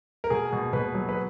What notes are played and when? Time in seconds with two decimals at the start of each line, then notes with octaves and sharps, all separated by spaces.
0.24 A#4
0.30 B2 G#4
0.53 B2
0.73 B2 B4
0.94 F#3
1.09 B4